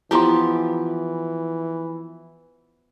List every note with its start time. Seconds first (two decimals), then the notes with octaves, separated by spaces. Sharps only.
0.11 E3 F3 B3 E4 G4 A#5 C6